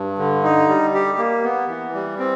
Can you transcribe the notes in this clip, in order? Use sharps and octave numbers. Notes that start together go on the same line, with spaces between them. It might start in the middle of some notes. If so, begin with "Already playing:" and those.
Already playing: G2
D3
D#4
G3
G4
A#3
B3
E3
G3
C4